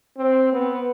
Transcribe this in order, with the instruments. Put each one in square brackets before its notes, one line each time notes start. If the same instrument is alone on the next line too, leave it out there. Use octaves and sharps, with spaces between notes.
[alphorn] C4
B3